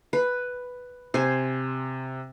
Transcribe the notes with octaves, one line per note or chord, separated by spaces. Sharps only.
B4
C3 C5 G#5